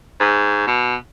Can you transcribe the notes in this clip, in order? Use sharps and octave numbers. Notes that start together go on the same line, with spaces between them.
G#2
B2